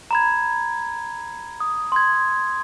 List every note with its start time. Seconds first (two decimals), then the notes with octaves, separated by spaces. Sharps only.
0.11 A#5 B5 G#6
1.60 D#6
1.92 C6 G#6